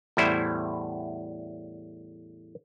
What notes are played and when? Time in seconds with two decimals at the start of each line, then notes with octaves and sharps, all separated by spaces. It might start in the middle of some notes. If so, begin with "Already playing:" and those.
0.17 E2 A2 G3 E4 C5 E5